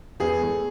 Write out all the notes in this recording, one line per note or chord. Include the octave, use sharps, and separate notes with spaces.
E2 G#4
A3